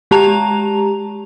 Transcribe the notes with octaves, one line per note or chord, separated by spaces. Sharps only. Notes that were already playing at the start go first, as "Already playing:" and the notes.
G#3 G4 A5 A#5 F7